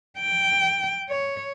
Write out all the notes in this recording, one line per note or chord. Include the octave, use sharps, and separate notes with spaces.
G5
C#5